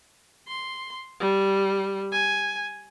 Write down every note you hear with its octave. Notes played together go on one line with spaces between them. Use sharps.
C6
G3
G#5